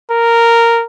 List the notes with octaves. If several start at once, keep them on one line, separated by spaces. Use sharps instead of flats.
A#4